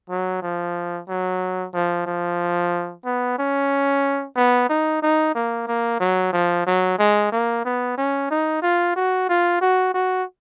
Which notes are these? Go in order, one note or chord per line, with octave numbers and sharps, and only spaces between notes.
F#3
F3
F#3
F3
F3
B3
C#4
B3
D#4
D#4
A#3
A#3
F#3
F3
F#3
G#3
A#3
B3
C#4
D#4
F4
F#4
F4
F#4
F#4